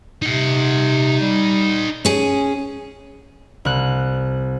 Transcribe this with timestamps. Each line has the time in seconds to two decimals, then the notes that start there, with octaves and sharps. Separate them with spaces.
0.22 C3 D#4 F#5
1.21 G3
2.05 C#4 G#4
3.65 C2 F#6